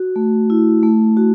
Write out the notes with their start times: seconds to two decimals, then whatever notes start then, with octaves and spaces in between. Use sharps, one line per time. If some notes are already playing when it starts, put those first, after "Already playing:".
Already playing: F#4
0.16 A3
0.50 E4
0.83 A3
1.17 F#4